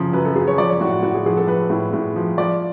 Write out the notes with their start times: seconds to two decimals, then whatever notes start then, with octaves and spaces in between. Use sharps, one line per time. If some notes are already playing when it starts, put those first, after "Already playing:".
Already playing: F#2 C#3 F3
0.13 F#2 B4
0.25 A4
0.36 F#2 G#4
0.48 C#5
0.58 F3 D5
0.69 C#5
0.80 A2 F#4
0.92 F#4
1.03 A2 F#4
1.15 G#4
1.26 F3 G#4
1.37 A4
1.47 F3 B4
1.70 A2
1.93 A2
2.16 F3
2.38 F3 D5